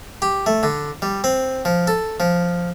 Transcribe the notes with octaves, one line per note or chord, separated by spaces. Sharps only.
G4
A3
D3
G3
C4
F3
A4
F3